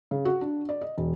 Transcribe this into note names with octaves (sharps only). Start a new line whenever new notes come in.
C#3
F#4
D4
D5
D#5
E1